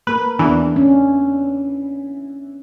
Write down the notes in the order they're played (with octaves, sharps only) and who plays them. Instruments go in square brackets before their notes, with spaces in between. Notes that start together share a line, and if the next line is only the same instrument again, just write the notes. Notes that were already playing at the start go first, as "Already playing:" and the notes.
[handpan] A#3 A#4 [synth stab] B4
[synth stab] E2 E3 [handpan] D4
[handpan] C#4